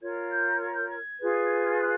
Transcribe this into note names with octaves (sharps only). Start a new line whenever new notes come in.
F4 A#4 C#5 G#6
G6
G#6
G6
G#6
F4 G#4 B4
F#6